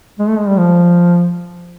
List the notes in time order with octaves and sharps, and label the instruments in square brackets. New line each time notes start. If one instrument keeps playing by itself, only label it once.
[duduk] G#3
A3
G#3
G3
F3